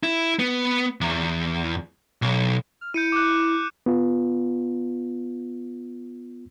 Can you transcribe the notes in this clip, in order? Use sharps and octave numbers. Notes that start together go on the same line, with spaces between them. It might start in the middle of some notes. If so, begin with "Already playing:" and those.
E4
B3
E2
B1
F6
E4 G6 C#7 D#7
D6 F#6
B3 F4